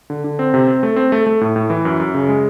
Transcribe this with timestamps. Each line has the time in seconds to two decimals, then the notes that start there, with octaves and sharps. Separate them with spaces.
0.10 D3
0.24 D3
0.39 C4
0.54 C3
0.68 C4
0.83 A3
0.96 C4
1.12 A3
1.27 A3
1.41 A2
1.56 A2
1.70 E3
1.85 F#2
2.00 F#2
2.14 C#3
2.29 G#3